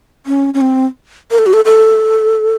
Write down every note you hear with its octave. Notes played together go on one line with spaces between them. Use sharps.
C#4
C#4
C4
A#4
A4
F#4
A4
A4